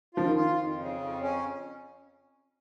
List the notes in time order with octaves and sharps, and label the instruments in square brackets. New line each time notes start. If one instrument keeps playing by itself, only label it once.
[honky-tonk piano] F3 [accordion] F4
[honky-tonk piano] D#3
[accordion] F4
F2
C#3
F2
C#4